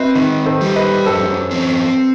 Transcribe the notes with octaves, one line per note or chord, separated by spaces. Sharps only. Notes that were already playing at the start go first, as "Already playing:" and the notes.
Already playing: C4 F#4 B4 D#5 E5
D#3 B4 D#5
A4 C5
G3
B4 D#5
F#2 A4 C5
C4